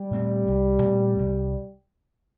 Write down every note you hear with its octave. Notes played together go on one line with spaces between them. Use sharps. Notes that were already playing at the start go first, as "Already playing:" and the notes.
Already playing: G3
A#2 A3 C4
C2
A#2 A3 C4
C2